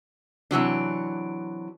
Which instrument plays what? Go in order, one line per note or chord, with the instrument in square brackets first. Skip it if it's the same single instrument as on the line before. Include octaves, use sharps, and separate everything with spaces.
[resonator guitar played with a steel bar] C3 E3 F#3 D4